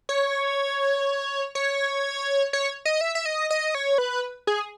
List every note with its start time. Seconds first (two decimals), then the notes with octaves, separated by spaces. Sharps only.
0.09 C#5
1.55 C#5
2.53 C#5
2.85 D#5
3.01 E5
3.15 E5
3.26 D#5
3.50 D#5
3.75 C#5
3.98 B4
4.47 G#4